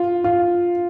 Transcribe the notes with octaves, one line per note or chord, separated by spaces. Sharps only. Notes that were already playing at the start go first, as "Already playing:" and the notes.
Already playing: F4
F4